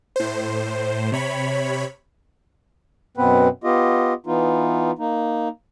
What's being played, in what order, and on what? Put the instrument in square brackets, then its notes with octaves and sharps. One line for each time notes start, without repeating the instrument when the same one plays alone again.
[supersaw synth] A2 C5
C3 C#5 B5
[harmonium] F#2 B2 B3 C4 B4
B3 F4 G4 D#5
E3 B3 D#4 F4
A#3 D#4